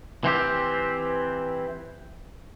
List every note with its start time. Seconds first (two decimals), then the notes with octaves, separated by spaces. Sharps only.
0.24 E3 C4 G4